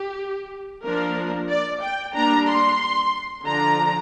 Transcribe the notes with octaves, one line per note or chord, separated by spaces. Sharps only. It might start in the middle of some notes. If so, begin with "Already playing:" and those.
Already playing: G4
F3 A#3 D4 A#4
D5
G5
G3 A#3 D4 A#5
C6
D3 F3 D4 A#5